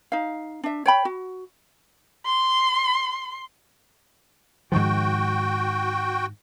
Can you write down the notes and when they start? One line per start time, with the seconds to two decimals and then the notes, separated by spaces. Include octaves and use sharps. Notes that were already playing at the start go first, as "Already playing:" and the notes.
0.12 D#4 F5
0.63 D4 E5
0.86 C#5 G5 B5
1.05 F#4
2.26 C6
4.72 G#2 D#3 F3 F#4 G5